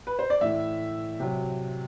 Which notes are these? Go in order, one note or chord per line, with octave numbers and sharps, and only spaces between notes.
B4
C5
D5
A2 E3 E5
C3 F#3